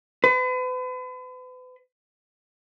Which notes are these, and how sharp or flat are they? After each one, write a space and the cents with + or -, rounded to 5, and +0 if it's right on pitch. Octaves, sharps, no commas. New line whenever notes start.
B4 +40